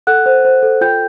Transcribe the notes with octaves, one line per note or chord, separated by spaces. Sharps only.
A4 F#5 F#6
C5
C5
A4
F4 G5 G6